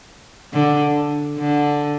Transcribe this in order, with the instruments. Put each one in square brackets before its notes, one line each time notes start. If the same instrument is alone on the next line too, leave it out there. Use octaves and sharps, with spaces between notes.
[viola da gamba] D3
D3